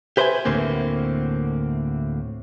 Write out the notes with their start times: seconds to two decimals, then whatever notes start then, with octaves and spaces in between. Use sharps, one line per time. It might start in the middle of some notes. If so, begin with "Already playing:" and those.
0.17 G4 B4 C5 D5 E5 G#5
0.45 D2 A2 D3 A#3 C4